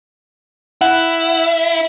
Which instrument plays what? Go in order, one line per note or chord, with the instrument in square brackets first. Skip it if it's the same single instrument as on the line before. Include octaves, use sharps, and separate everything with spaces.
[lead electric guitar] E4 [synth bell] F#5